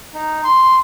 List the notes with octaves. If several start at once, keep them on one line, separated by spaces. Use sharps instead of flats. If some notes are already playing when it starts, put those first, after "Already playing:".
D#4
C6